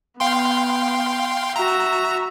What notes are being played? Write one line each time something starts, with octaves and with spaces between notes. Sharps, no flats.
B3 F5 G5 C6
F#4 E5 A#5